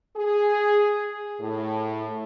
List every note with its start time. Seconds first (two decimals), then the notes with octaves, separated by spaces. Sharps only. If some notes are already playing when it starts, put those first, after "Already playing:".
0.17 G#4
1.41 A2